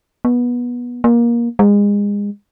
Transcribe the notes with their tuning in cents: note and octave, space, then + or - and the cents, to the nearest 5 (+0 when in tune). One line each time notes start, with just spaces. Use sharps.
B3 -20
A#3 +20
G#3 -30